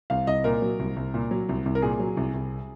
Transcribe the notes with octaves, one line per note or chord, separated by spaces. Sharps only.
C2 F5
C2 D#5
A#2 A#4
F#3
C2
C2
A#2
F#3
C2
C2
A#4
A#2 G#4
F#3
C2
C2